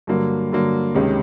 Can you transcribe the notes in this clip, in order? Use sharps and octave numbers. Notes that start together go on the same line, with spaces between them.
G2 D3 F#3 A#3
G2 D3 F#3 A#3
C#2 C3 D#3 G#3 C#4